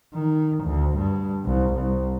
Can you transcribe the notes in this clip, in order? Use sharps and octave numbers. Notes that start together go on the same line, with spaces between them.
D#3
D2
G2
C2
C2